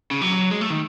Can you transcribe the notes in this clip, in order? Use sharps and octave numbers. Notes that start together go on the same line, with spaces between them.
C#3
F#3
G#3
A3
D#3